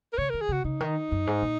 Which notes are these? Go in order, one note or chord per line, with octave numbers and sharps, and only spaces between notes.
A#4
C#3 C#5
D#3 A#4
G#4
C#3 F#4
C#3 D#4
D#3
F#2
G#2
A#2